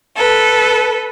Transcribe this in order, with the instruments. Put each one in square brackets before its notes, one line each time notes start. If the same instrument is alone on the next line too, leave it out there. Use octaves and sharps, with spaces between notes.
[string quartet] A4 B4